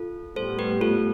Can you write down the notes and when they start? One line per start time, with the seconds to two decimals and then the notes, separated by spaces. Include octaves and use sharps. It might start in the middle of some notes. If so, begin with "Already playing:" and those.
Already playing: F4 A4
0.36 A2 G3 B3 A4 C5
0.59 G4 B4
0.81 F4 A4